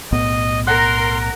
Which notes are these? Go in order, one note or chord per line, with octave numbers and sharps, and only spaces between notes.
B1 A2 B3 D#5
A#4 F#5 A#5 C6